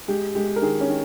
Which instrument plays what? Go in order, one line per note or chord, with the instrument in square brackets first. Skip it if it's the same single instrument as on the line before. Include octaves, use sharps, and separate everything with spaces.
[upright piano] G#3 G4
G#3 G4
A#4
D#3 G#4
C#4
D#3